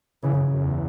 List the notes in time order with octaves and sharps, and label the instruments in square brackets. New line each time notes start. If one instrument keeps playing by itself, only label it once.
[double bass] C#3 [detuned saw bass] E3
[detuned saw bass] F#2
F#2
E2